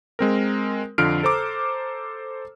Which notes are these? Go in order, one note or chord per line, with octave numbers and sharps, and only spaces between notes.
G#3 C4 A#4
F2 D3 F4 F6 C7 D7
A4 C5 A#5 D6 E6